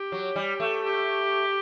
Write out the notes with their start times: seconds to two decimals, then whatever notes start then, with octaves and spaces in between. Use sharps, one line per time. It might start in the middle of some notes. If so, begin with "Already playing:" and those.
Already playing: G4
0.12 F#3
0.36 G3
0.60 A3
0.83 G4